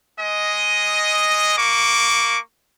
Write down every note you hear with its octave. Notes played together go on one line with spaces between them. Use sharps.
G#3 D#5
A#3 C#6 D6